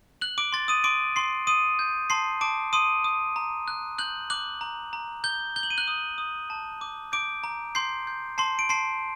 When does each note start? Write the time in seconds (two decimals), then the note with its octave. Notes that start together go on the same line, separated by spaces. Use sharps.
0.21 F#6 F#7
0.38 D6 D7
0.52 C6 A6
0.68 D#6 D#7
0.84 C6 D6 D7
1.16 C6 C7
1.47 C6 D#6 D#7
1.79 G6
2.10 A5 C6 C7
2.41 A5 D6 D7
2.73 C6 D#6 D#7
3.04 D#6
3.36 A#5
3.68 F#6
3.98 F#6 G6 F#7
4.30 D6 F#6 F#7
4.61 A#5
4.93 A#5
5.24 G6 G7
5.56 G6 G7
5.63 F#7
5.70 D#7
5.77 F#6 F#7
5.88 D#6
6.18 D#6
6.50 A5
6.81 D6
7.12 D6 G6 D7
7.44 A#5
7.75 C6 G6 C7
8.07 G6
8.38 A5 C6 C7
8.59 D7
8.69 A5 C6 C7